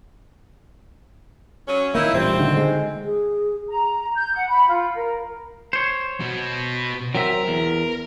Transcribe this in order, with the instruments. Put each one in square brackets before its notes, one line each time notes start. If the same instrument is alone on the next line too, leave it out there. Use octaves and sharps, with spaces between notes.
[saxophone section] F#3 C#4
[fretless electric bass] D#3 A#3 [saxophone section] D#4 E4
[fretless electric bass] E1 A1 A#2 [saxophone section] D2 C4 [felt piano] G3
[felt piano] D3 D#3
[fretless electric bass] G#3
[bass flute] G#4
[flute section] A#5
G6
F#5
B5
F4
A#4
[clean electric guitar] C5 C#5
[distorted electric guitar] B2
[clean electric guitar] F#3 C4 E5 [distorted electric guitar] A#4
[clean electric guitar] E2